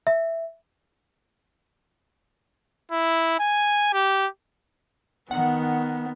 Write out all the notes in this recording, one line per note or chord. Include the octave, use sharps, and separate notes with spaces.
E5
E4
G#5
G4
D#3 B3 F#5